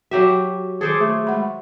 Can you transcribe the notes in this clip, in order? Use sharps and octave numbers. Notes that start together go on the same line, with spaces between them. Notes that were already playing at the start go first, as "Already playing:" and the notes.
F#3 F#4 G4 E5
D#3 G#4 A4 C5 D5
A3 G#4
G#3 F#5 B5